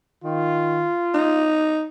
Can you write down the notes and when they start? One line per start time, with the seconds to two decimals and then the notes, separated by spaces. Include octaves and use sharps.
0.24 D#3 F4
1.14 D#4